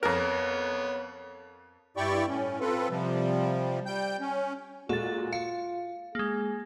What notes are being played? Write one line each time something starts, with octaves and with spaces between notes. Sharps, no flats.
F2 B3 A#4 C#5
G2 E4 G4 D5 G5 C#6
A2 C#4
C4 F4 A4 B4
C3 F3 G3
G3 G5 G6
C#4
A#2 G#3 F4 F#4 A4 A6
F5 C#7
G#3 A#3 G#4